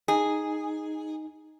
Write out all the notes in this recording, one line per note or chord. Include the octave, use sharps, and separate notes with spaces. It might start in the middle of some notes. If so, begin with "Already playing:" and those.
D#4 G#4